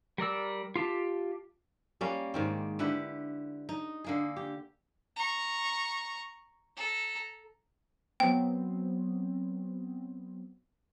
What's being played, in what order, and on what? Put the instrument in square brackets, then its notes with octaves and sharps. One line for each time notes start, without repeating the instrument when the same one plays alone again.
[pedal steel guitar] G3 A#4 D5 E6
F4 G4 A5
[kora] G3 A#3 C#4
G#2 D#3 C4
D3 E4 G4 B4
D#4
D3 A#3 G#4
G4
[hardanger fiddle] A#5 C#6
A4 A#5
[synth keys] F#3 B3 C4 [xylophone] G5